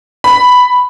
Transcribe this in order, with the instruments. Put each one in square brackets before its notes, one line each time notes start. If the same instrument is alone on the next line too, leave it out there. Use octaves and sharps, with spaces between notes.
[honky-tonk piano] B5